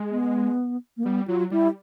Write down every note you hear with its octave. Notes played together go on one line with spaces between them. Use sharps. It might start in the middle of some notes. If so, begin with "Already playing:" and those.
Already playing: G#3
B3
A#3
G3 B3
F#3 F4
G3 E4